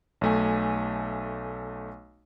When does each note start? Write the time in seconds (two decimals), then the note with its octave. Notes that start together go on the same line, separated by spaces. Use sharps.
0.21 B1 A3 G#5